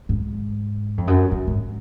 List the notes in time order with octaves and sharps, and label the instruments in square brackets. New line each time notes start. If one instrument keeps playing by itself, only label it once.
[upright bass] G#2
F2
F#2
F#2
G#2